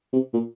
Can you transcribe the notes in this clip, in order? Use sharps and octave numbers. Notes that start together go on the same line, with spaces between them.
C3
A#2